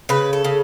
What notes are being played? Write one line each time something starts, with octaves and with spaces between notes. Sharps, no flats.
C#3 B4
A4
C#3